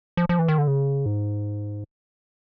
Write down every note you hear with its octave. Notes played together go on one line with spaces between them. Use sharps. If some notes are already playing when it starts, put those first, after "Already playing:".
F3
F3
E3
D#3
D3
C#3
G#2